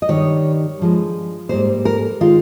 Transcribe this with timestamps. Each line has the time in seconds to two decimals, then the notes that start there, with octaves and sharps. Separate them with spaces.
0.02 D#5
0.09 G2 D#3 G3 C#5
0.79 G2 F3 G#3
1.49 G#2 G3 A#3 C5
1.85 A#4
2.20 D#3 G#3 F4